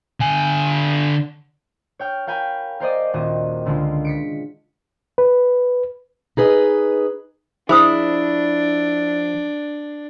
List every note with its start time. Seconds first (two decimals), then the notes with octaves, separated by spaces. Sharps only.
0.20 D3 G#5
1.99 C#5 G5 F6
2.27 A#4 F5 G5 G#5 B5
2.80 A#4 C5 D5 D#5
3.13 D#1 F#4 D#5
3.65 C#2 D3 G#3 F4
4.05 B6 C#7 D7
5.18 B4
6.37 D#4 G#4 B4 D#5
7.69 F3 D4 E4 G#4 C5 D#6